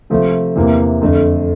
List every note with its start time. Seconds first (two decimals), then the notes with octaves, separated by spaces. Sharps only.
0.10 C3 F3 A3
0.56 E2 C3 E3 A#3
1.01 F2 D3 A3